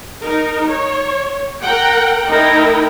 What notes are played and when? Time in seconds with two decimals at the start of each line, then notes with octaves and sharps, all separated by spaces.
0.24 D#4 A#4
0.68 C#5
1.62 A#4 F#5 G5
2.29 A3 D#4 E4 A#4 G5